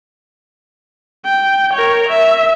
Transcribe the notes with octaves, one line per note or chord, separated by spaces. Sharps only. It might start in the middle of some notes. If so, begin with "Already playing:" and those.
G5
A#4 C#5
E5